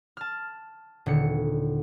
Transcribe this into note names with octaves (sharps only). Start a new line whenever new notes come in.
A5 F6
D#1 D3 C#7